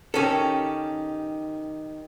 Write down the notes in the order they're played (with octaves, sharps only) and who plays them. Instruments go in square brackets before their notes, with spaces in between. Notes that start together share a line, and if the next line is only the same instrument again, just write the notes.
[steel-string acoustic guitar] D#3 G4 [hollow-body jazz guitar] C#4 A4